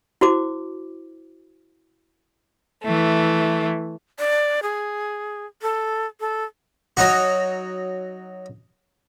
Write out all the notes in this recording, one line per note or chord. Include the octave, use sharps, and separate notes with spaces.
E4 F#4 C5 D6
E3 A3
D5
G#4
A4
A4
F#3 D#4 F#4